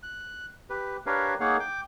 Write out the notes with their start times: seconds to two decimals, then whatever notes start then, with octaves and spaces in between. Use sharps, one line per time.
0.03 F#6
0.70 G4 B4
1.06 D4 G4 A#4 B4 C#5 F5
1.40 A#3 D#4 G#4 C#5 F5 F#5
1.60 G5 D6